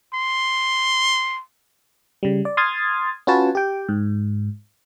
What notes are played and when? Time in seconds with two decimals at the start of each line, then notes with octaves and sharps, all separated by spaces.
0.14 C6
2.23 C#3 G3
2.45 D5
2.57 C6 D#6 F6 G#6 A6
3.27 C#4 F4 F#4 B4 C#5 A5
3.55 G4 G5
3.89 G#2